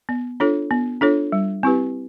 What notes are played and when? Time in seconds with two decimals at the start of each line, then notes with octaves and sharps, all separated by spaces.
0.09 B3
0.40 D4 F4 A4 C#5
0.71 B3
1.01 D4 F4 A4 C#5
1.32 G3
1.63 C4 E4 G4 B4